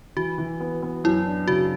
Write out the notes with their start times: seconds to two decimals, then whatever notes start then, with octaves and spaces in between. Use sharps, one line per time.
0.16 E3 F#4
0.38 E3
0.60 B3
0.82 B3
1.04 F#2 E4
1.26 D4
1.48 C#3 F#4